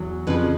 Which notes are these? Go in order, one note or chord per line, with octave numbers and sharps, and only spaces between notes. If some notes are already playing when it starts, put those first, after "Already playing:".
Already playing: E2 F#3
F2 C#3 F3 B4